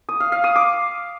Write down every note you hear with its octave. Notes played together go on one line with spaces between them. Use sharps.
D#6
F5
F5
D#6
D6